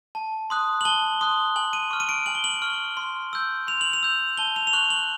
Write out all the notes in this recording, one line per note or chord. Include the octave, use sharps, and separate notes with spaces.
A5
C6 D#6 F#6
F#7
A5 G7
C6 D#6 F#6
G#5 F#7
D#7
C#6 F6
D#7
D7
G#5 F#7
G7
F#7
C#6 F6
C6
E6 G6
C6 F7
F#7
F7
E6 G6
A5 G7
F7
F7
C#6 F#6 F#7
F#7